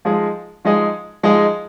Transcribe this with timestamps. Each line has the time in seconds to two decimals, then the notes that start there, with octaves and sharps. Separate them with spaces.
0.05 F3 G#3 D#4 G#4
0.65 F3 G#3 D#4 G#4
1.23 F3 G#3 D#4 G#4